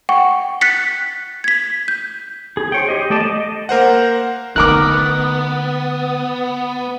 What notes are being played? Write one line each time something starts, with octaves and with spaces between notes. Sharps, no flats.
F#5 G5 C#6
F#6 A6 B6 C#7
G#6 B6
G6
G#4
C5 C#5 G5
G4 D#5
A3 D5 D#5 A5
D#5
A#3 A#4 C5 F#5
D3 D#3 A3 B3 A#4 D6 F#6